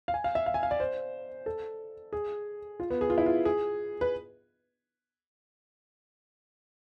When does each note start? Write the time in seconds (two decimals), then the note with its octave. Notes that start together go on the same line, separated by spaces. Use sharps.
0.08 F5
0.14 G#5
0.24 F5
0.35 E5
0.46 F5
0.54 G#5
0.63 F5
0.71 D5
0.80 C5
1.46 A4
2.13 G#4
2.80 F4
2.90 B3
3.01 G#4
3.10 F4
3.18 E4
3.26 F4
3.45 G#4
4.01 B4